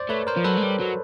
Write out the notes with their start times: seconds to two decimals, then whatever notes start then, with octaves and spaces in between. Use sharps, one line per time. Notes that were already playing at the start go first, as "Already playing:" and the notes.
Already playing: C5 D5
0.09 A3 B4 C#5
0.27 A#4 C5
0.37 F3
0.44 F#3 A4 B4
0.57 G#3
0.63 G3
0.80 F#3